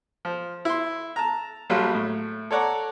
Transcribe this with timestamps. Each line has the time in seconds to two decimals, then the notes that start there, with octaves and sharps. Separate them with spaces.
0.25 F3
0.65 E4 C6
1.16 A5 A#5
1.70 A#1 F#3 G3 F4 A4
1.94 A2
2.51 A4 C#5 D5 F#5 A#5